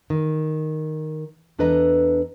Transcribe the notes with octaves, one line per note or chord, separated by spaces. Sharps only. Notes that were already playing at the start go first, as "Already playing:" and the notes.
D#3
E2 D4 A4 B4 D#5 A#5